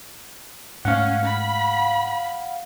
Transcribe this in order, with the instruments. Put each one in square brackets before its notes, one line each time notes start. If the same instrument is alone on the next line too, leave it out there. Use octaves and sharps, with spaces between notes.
[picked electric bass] G#2 G#3 A3 [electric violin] C#4 [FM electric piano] F5 F#5
[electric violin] B5